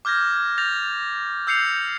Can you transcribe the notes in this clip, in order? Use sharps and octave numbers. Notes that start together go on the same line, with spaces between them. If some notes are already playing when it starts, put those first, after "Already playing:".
D6 F6 G6 G#6 A#6
G6 A6 A#6 F7
E6 G6 C7 C#7 F7